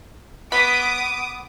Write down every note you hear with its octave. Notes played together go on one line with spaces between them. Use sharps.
B3 D6 D#6 B6